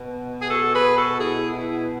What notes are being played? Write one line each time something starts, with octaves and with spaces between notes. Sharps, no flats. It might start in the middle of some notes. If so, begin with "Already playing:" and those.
Already playing: B2
G#4
F#4 A4
G#4 B4
F#4 A4
E4 G#4
E4 G#4